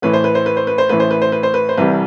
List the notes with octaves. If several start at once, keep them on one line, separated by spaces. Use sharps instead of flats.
A1 A2 E3 B4
C5
B4
C5
B4
C5
B4
C5
A1 A2 E3 B4
C5
B4
C5
B4
C5
B4
C5
C2 C3 E3 G3 B4